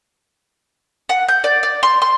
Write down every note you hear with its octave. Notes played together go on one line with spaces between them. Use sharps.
F#5
G6
D5
D5
C6
C6